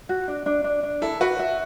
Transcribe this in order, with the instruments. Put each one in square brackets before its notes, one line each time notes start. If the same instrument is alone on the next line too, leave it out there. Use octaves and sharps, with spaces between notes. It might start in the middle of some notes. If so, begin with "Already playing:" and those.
[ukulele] F#4
D4
D4
D4
D4
[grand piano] E4 [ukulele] A4
[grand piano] F#4 [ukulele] B4
[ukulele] E5